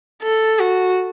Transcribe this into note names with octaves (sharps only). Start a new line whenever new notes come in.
A4
F#4